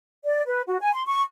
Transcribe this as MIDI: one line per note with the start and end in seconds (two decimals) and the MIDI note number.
0.24 0.41 74
0.46 0.62 71
0.67 0.78 66
0.81 0.91 80
0.93 1.04 84
1.06 1.22 85